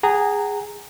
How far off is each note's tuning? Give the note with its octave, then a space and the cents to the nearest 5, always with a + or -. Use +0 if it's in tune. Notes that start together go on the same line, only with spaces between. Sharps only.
G#4 -10 F#5 +30 A#5 -15